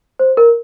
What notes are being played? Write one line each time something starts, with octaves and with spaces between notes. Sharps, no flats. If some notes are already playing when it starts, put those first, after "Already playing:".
C5
A#4